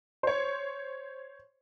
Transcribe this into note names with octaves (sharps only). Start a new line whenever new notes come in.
C5 C#5